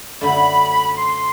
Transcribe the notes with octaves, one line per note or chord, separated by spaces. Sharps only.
F#2 D3 F#3 A3 D4 B5
C6